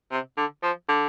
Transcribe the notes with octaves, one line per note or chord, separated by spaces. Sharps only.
C3
D3
F3
D3